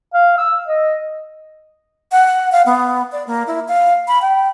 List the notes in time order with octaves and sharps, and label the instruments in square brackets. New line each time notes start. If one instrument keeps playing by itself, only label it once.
[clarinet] F5
E6
D#5
[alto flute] F#5
F5
B3
D5
A#3
E4
F5
B5
G5